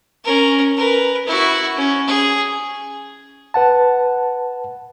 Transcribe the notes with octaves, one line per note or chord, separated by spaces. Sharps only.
C#4 A#4
A#4 B4
E4 F#4
C#4
G#4
B4 F#5 A5